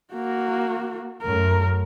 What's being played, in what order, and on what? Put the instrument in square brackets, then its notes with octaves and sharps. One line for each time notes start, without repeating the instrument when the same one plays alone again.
[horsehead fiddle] A#3 F#4
[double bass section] F#2 A3 [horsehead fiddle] A#4